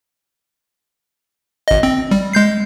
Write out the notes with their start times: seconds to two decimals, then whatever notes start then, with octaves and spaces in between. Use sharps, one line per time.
1.68 G#1 D#5
1.83 C4
2.11 G3
2.33 G#3 G6 C7